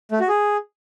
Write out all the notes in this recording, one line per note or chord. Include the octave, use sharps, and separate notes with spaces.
A3
F#4
G#4